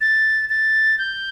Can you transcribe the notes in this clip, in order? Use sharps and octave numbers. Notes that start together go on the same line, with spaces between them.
A6
A6
G6